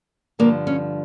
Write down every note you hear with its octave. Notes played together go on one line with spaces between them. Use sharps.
G2 D3 F3 A#3
C#4